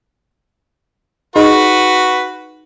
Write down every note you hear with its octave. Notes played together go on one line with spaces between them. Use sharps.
D#4 F#4 G#4 B4 D#5